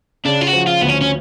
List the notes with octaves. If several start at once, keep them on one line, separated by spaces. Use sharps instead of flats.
C#3 D4
F4
F#4
F3
F4
D2 B3
C#4
C#4